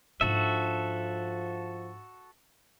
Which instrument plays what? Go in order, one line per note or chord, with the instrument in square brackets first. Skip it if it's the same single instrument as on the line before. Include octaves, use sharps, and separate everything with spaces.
[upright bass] G#2 D4 [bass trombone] F3 [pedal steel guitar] F#4 A4 E5